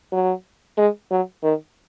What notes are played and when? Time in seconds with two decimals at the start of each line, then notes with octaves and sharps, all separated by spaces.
0.12 F#3
0.78 G#3
1.11 F#3
1.43 D#3